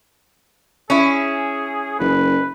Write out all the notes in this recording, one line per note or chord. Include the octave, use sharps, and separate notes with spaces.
C#4 E4 G#4
F#1 B4